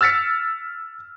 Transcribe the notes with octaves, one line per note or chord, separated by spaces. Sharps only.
E6 F6 A6 B6 C#7